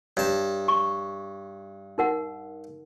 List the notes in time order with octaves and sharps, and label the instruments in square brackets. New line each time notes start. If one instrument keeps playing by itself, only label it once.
[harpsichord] G2 A5 [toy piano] C#5
[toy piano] C#6
D#4 A#4 F#5